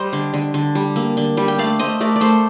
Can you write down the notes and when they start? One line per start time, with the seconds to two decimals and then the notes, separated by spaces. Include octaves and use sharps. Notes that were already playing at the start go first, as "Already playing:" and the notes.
Already playing: G3 C5 D#5
0.13 D3
0.34 D3
0.54 D3
0.75 G3
0.96 A#3
1.17 D3
1.37 G3
1.48 G5
1.58 A3 D5 F5
1.79 A3 C5 D#5
2.00 A3 A#4 D5
2.16 D5
2.21 A3 A4 C5